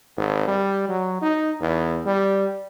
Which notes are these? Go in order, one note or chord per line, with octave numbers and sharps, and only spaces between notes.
G#1
G3
F#3
D#4
E2
G3